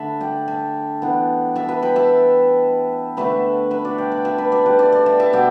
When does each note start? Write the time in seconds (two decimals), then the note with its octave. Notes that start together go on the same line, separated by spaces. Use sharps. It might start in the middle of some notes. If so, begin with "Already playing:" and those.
Already playing: D3 A3 D4 E5 A5 B5
0.21 D5 G5
0.48 E5 A5
1.02 E3 B3 D4
1.56 E5 A5
1.68 B4 E5
1.82 G5 B5
1.96 E5 A5
3.17 D3 A3 D4 B4 E5
3.71 B4 E5
3.85 A4 D5
3.98 D5 G5
4.12 G5 B5
4.25 E5 A5
4.38 B4 E5
4.52 A4 D5
4.66 G4 B4
4.79 A4 D5
4.92 A4 D5
5.06 E5 A5
5.20 E5 A5
5.33 B2 B3 D5 G5